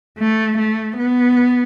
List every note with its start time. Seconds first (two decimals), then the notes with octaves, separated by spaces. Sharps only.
0.18 A3
0.58 A3
0.97 B3